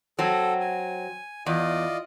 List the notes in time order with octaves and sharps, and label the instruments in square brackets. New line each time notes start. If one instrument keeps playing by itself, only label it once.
[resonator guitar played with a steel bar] F#3 C4 [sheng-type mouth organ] A4
[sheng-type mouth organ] G#5
[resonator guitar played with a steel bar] E2 [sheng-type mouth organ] F4 D5 D#5